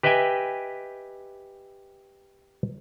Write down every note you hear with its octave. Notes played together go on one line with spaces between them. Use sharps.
G4 B4 D#5 E5 G5 G#5